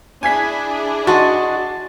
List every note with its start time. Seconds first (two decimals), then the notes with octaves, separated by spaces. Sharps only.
0.23 D4 E4 G#4 G#5 G#6 B6
1.07 F#4 D#5 A5 C6 A6